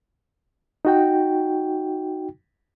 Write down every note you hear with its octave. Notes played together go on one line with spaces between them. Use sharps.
D#4 F#4 G5